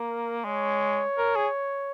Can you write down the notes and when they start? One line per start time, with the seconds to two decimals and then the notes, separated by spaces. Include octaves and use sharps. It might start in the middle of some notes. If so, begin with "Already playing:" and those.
Already playing: A#3 A#4
0.44 G#3 C#5
1.18 A#4
1.36 G#4